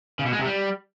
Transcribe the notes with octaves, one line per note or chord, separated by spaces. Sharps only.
C#3
B2
G#3
C3
G3